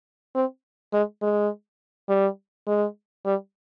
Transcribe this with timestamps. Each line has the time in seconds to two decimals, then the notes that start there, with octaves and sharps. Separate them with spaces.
0.35 C4
0.93 G#3
1.22 G#3
2.09 G3
2.67 G#3
3.26 G3